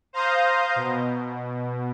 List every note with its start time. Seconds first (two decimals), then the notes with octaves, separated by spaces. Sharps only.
0.13 C5 F5 A#5 C6 D#6 G6
0.76 B2